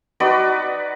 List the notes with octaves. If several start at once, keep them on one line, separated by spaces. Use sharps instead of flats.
D#4 F#4 B4 D5